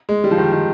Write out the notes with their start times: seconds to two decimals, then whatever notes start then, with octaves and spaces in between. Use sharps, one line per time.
0.09 G#3
0.24 G3
0.31 F3
0.38 D#3
0.52 D#3